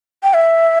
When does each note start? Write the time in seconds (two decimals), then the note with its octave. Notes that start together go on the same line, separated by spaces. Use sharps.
0.23 G5
0.35 E5